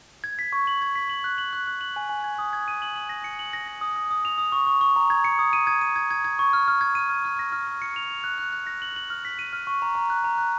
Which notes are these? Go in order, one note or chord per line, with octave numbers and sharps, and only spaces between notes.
G#6
B6
C#6
F#7
G#6
B6
F#7
F#6
F#7
F#6
F#6
F#7
G#5
G#5
G#6
D#6
G#6
D#7
F#7
F#7
A#6
C#7
F#7
A#6
A#6
D#6
D#6
D#6
F7
D#6
C#6
C#6
C#6
A#5
G#6
C#7
D#6
D#7
G#6
D#7
G#6
G#6
G#6
C#6
F6
F6
G#6
D#7
F6
F6
A#6
F6
F6
C#7
F7
F7
F#6
F#6
F#6
A#6
F#7
F#7
F6
B6
D#7
F6
C#6
A#5
A#5
F#6
A#5
F#6